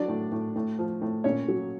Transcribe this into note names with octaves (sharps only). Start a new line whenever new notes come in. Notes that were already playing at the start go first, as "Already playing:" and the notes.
Already playing: F#3 D4 D5
A2
A2
A2
F3
A2
A#2 C#4 C#5
F#3